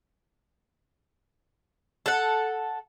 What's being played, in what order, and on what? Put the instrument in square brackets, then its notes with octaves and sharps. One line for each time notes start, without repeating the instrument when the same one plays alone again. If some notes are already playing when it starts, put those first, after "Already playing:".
[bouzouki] A4 F#5